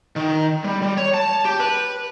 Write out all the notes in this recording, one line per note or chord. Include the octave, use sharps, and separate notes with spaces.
D#3
G3
G3
C#5
A5
G4
B4